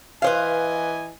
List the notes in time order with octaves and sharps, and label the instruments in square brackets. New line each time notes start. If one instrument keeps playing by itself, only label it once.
[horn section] E3 D#5 G#5 [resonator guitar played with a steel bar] B4 C5 F5